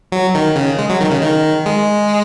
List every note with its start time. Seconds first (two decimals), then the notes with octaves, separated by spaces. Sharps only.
0.12 F#3
0.35 D#3
0.56 C#3
0.78 G#3
0.90 F#3
1.01 D#3
1.10 C#3
1.22 D#3
1.66 G#3